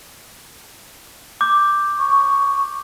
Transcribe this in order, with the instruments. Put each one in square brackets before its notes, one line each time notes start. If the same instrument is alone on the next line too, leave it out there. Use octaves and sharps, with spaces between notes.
[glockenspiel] D6 G6
[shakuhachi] C#6